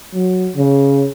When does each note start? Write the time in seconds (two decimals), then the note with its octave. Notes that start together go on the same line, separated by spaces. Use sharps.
0.14 F#3
0.56 C#3